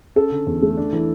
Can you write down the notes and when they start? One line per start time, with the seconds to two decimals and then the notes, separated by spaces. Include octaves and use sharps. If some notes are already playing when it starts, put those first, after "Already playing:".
0.16 C#4 A4
0.31 D3
0.46 E2
0.62 A3
0.77 D4
0.93 E3